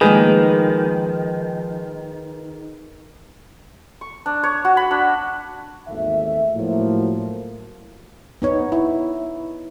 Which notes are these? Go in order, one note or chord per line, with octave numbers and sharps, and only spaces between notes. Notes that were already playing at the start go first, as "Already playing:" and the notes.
D#3 F3 G#3 A#3 G#4 B4
C#6
D4
C#5
F#4
B5
D4
G#1 D#2 E3 A3 E5
A2 F3 F#3 A#3
B3 D#4 C#5
E4